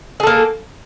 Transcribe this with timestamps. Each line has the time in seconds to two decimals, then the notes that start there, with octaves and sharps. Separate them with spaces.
0.20 G#4
0.23 A4
0.27 A#3